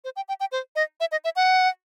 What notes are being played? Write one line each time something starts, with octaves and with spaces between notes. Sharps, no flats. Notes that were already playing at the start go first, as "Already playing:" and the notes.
C5
G5
G5
G5
C5
D#5
E5
D#5
E5
F#5